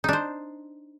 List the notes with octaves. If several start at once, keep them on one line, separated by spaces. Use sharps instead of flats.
D4 D#4 C5